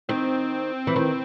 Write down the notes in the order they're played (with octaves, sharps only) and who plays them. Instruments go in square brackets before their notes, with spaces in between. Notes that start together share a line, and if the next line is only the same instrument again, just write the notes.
[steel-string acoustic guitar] D#3 [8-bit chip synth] C4
[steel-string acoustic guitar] E3
D#3